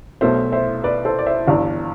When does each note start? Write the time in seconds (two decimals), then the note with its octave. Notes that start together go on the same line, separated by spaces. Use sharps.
0.21 B1 B2 A3 C5 E5
0.52 C5 E5
0.84 B4 D5
1.05 A4 C5
1.19 D5
1.26 C5 E5
1.47 G1 G2 E3 D5 F5